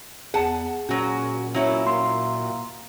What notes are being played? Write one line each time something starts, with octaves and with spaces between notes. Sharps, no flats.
E2 G#4 F#5 A5
A#2 F#3 C#4 F#4
F#3 C#4 E4 C#5
A#3 C6